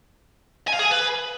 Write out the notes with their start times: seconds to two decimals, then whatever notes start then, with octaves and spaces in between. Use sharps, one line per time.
0.68 G#5
0.73 F5
0.79 G#4
0.85 G#5
0.91 B4